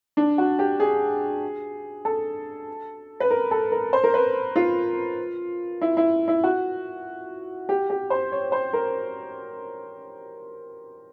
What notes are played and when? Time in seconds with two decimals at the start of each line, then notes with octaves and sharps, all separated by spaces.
0.17 D4
0.38 F#4
0.59 G4
0.80 G#4
2.05 A4
3.20 B4
3.30 A#4
3.51 A4
3.72 A#4
3.93 C5
4.04 A#4
4.14 B4
4.56 F4
5.82 E4
5.97 E4
6.28 E4
6.44 F#4
7.69 G4
7.90 G4
8.10 C5
8.32 C#5
8.52 C5
8.73 A#4